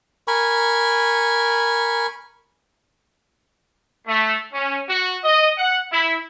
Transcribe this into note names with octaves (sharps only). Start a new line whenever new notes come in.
A#4 G#5 B5 C#6
A3
C#4
F#4
D#5
F#5
E4